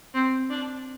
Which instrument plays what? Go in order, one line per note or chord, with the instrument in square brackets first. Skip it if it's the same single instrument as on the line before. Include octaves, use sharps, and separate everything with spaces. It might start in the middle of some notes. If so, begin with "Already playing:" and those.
[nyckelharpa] C4
D4